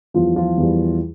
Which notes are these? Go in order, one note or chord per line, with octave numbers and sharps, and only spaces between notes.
E2 E3 F3 G3 F4
F3 F4
E2 E3 G3